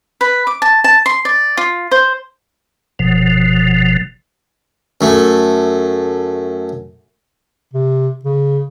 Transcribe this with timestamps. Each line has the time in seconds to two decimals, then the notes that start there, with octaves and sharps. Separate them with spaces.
0.21 B4
0.47 D6
0.62 A5
0.84 A5
1.06 C6
1.25 D5
1.57 F4
1.91 C5
2.99 F#1 B2 F3
5.01 F#2 A3
7.73 C3
8.25 C#3